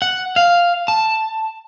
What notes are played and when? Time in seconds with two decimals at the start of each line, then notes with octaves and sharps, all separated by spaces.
0.02 F#5
0.36 F5
0.88 A5